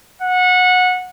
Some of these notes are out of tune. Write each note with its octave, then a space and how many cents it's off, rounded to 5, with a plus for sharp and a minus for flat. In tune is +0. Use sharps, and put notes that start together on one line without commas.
F#5 -20